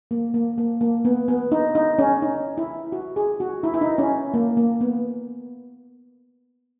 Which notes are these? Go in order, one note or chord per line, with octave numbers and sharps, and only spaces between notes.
A#3
A#3
A#3
A#3
B3
B3
D#4
D#4
C#4
D#4
E4
F#4
G#4
F#4
E4
E4
D#4
C#4
A#3
A#3
B3